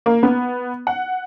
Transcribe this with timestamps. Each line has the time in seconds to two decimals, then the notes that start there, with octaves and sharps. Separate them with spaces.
0.06 A#3
0.23 B3
0.87 F#5